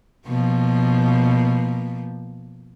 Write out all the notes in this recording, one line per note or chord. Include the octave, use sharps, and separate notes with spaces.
B2 F3 A#3